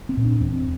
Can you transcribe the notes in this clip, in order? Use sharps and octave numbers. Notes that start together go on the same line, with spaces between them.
C4
A#2
D4
E2 C4